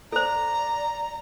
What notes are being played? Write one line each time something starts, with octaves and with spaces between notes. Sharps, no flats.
A4 C5 D5 A#5